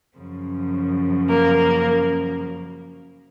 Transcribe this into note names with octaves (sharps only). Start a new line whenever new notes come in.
F#2 C#3 F3
A#3 A#4
A#3 A#4